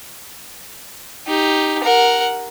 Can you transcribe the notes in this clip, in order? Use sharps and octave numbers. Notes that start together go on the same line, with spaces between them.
D#4 G4
A#4 F#5